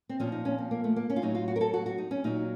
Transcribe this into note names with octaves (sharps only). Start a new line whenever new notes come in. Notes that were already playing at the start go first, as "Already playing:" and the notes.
C4
A#2 F3 C#4
D#4
C#4
C4
A#3
A3
A#3
C#4
F4
A2 F#3 D#4
F4
F#4
A#4
A4
F#4
F#4
D#4
C#4
A#2 F#3 D#4